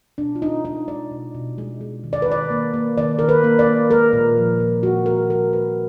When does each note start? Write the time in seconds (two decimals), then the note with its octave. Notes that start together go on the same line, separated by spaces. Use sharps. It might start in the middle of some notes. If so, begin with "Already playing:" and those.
0.18 B2 D4
0.35 F4
0.41 B2 D#4
0.65 G#3 D#4
0.88 G#3 D5
1.11 B2
1.35 B2
1.58 G#3
1.81 G#3
2.04 D#3
2.13 D5
2.22 B4
2.27 D#3 D5
2.51 A#3
2.74 A#3
2.98 D#3 D5
3.19 D#3 A#4
3.29 B4
3.44 A#3
3.59 D5
3.67 A#3
3.90 G#3 A#4
4.13 A#2
4.37 F3
4.60 A#2
4.83 G#3 F#4
5.06 A#2 A#4
5.30 F3 A#4
5.53 A#2 B4